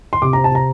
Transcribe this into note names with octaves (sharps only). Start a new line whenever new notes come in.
C6
C3 D6
C4 A#5
A5
C3 A#5